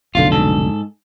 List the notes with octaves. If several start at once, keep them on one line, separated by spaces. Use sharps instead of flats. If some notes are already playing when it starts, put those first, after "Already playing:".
F1 B1 D3 F4
G#2 A4